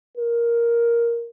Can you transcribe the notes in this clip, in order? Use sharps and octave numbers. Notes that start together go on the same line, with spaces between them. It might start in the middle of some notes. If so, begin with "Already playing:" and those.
A#4